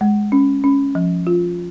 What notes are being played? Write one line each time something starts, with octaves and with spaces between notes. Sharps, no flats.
G#3
C#4
C#4
F3
F4